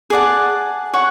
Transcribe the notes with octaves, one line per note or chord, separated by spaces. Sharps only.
G#4 D5 F#5 A5
C#5 F#5 C#6